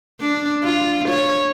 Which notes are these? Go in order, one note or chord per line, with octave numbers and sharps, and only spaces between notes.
D4
F4
C#5